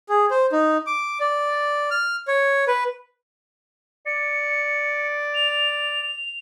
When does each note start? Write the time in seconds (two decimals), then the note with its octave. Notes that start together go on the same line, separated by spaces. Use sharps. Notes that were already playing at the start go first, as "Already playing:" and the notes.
0.09 G#4
0.31 C5
0.52 D#4
0.87 D6
1.20 D5
1.91 F6
2.28 C#5
2.68 B4
4.06 D5 C#7
5.35 F7